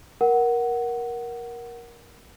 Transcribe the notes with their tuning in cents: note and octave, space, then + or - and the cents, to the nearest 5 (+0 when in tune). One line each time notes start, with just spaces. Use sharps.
A#4 +15 F#5 +10